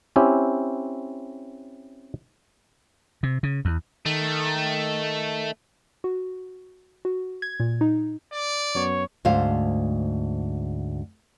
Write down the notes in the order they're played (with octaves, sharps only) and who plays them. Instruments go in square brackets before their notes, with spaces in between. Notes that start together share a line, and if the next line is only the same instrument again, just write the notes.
[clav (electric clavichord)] C4 C#4 E4 G4
[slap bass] C3
C#3
E2
[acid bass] D#3 [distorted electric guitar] A3
[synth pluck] F#4
F#4
G#6
A#2
D#4
[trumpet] D5
[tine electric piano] F#2 F#3 B3 [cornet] C#5
[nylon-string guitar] D2 G#2 C5 F5